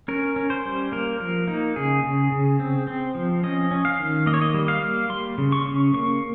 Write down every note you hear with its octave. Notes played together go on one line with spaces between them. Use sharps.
C#4 A#4
C#4
C5
G3
A#3 A#4
F3 A#4
A#3 D#4
C#3 G#4
C#3
C#3
C4
C4
F3
C#4 D#5
C#4
F5
D#3
A#3 D#5
C#5
D#5
G3
F5
A#3
G3 C6
C#3
C#6
C#4
A#3 C#6